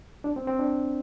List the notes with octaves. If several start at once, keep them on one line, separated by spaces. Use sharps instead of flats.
D4
C4
C4
D4